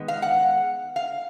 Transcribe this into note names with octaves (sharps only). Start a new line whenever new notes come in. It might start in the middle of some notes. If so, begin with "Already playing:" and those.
Already playing: D#3 G#3 B3
F5
F#5
F5